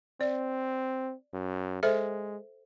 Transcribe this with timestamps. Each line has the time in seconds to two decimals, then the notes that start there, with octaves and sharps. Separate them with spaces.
0.21 C4 D5
1.34 F#2
1.83 G#3 A4 C5 E5